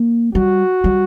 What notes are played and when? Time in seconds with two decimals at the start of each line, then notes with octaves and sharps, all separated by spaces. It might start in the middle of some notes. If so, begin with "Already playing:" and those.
Already playing: A#3
0.35 G3 F#4
0.84 G3